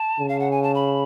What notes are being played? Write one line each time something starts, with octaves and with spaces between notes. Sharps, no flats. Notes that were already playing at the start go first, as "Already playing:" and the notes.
Already playing: A5
C#3
F5
F#5
G#5
A5
B5